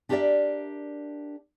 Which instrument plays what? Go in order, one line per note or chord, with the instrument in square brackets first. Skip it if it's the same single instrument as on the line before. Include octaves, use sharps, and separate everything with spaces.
[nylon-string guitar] D4 G4 A#4 B4 D5 E5